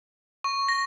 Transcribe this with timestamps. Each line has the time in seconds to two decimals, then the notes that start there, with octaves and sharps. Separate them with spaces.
0.44 C#6
0.69 A#6